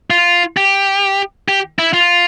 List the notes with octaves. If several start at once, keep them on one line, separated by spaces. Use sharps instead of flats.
F4
G4
G4
E4
F4